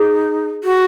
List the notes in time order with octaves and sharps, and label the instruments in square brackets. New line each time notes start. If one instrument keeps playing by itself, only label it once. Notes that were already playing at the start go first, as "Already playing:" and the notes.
Already playing: [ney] D#4 [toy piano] G#4
[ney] F#4